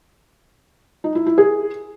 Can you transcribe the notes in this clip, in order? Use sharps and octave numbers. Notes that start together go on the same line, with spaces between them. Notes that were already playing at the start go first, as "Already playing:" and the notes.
D#4
E4
E4
G#4